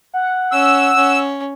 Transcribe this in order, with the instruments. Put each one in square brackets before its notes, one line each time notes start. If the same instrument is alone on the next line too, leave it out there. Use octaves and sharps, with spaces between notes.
[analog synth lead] F#5
[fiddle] C#4 [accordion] E6
[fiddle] C#4